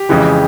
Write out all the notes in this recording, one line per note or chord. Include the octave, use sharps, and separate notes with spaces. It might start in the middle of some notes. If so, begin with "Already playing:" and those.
Already playing: G4
F2 C#3 E3 G#3